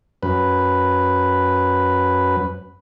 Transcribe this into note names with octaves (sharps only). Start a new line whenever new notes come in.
F#2 B4